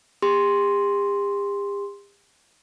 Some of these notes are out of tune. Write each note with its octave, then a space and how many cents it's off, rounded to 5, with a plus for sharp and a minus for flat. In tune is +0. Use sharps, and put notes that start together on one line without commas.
G4 +45 C6 +0